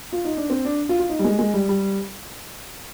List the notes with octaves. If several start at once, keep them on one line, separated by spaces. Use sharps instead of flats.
F4
D#4
D4
C4
D4
F4
F4
D#4
G3
G#3
G#3
G3
G3